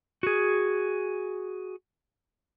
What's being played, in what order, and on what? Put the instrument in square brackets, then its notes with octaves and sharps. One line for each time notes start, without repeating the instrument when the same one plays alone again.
[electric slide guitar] F#4 G#4